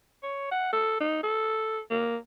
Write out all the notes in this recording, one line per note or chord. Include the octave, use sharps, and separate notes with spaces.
C#5
F#5
A4
D#4
A4
A#3